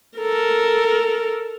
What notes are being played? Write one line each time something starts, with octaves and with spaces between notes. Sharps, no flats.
A4 A#4